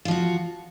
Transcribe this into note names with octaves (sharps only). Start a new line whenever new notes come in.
F3 F4 F#4